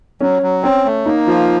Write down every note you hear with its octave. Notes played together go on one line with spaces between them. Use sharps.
F#3 C#4
F#3
C4 C#4
A3
A#3 D#4
F3 F4